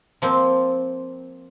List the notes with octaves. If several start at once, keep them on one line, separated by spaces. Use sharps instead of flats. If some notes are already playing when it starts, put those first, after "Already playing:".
F3 A#3 C4